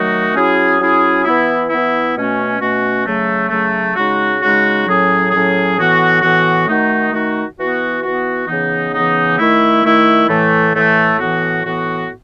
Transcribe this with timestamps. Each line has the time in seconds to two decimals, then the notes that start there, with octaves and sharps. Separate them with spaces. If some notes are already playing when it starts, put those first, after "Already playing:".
Already playing: D#3 F#3 A3 D#4 F#4
0.34 F#3 C#4 E4 G#4
0.79 F#3 C#4 E4 G#4
1.25 E3 B3 E4
1.69 E3 B3 E4
2.14 B2 A3 C#4 F#4
2.60 B2 A3 C#4 F#4
3.05 C#3 F#3 A3
3.50 C#3 F#3 A3
3.95 C#3 G#3 D#4 F#4
4.41 C#3 G#3 D#4 F#4
4.86 A2 F#3 C#4 G#4
5.31 A2 F#3 C#4 G#4
5.76 A2 E3 B3 F#4
6.22 A2 E3 B3 F#4
6.67 D#3 A3 D#4 F#4
7.11 D#3 A3 D#4 F#4
7.57 E3 B3 F#4
8.03 E3 B3 F#4
8.48 C#3 E3 B3 D#4
8.93 C#3 E3 B3 D#4
9.38 D#3 A3 E4
9.83 D#3 A3 E4
10.28 A2 E3 A3
10.74 A2 E3 A3
11.19 A2 E3 B3 F#4
11.64 A2 E3 B3 F#4